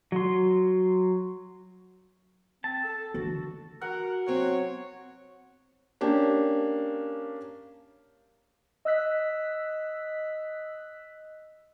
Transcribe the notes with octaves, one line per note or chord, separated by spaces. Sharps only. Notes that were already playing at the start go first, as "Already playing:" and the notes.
F#3 C6
C4 A5
A4
D3 E3 F#4
F#4 A#4 F#5
F#3 C4 C#5
A#3 C#4 D4 G4
D#5 E6 F#6 B6